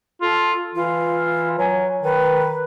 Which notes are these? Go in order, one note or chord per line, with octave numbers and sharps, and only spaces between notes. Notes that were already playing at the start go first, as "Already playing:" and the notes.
F4 A4
E3 F4
F#3 G#5
D#3 B4